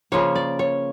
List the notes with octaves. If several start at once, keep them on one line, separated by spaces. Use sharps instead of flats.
C#3 F3 A#3 C#5
D5
C#5